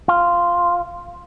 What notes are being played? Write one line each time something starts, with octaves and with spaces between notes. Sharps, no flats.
F4